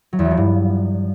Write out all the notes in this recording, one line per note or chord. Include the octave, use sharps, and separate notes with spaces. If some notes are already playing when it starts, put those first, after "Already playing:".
F#3
E2
F#3
F3
G2